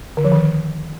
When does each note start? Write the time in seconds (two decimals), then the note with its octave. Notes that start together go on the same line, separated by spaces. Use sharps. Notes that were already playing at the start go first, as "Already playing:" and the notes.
0.17 D3
0.24 F3
0.32 D#3